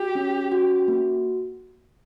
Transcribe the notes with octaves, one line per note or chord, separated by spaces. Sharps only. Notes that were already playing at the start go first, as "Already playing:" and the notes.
Already playing: F#4 G4
C#4
F#4
A#3